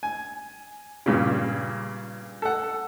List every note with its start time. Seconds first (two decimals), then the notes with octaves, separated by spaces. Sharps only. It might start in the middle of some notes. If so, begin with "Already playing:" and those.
0.03 G#5
1.06 G2 A#2 C#3
2.42 A4 F#5